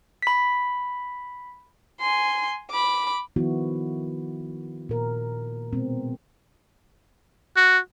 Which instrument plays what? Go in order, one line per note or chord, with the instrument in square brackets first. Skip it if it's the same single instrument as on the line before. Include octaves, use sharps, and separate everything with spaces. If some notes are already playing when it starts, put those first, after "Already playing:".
[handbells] B5 B6
[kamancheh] G#5 C6
B5 D6
[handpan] D#3 F3 B3 E4 F#4
A#2 A#4
B2 G#3 B3 C4
[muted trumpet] F#4